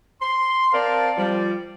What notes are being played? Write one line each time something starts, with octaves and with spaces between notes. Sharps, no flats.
C6
C4 A#4 C5 D5 F5 A5
F3 G3 D5